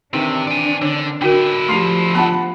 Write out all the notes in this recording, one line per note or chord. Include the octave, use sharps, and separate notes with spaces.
C3 D#3 E3 C4 D4
D5 G#5
D3 C#5
D3 D#4 E4 F#4 A#4 G5
F3 A3 D4 G4 C6 C7 F7
B3 D4 F4 F#5 A5 B5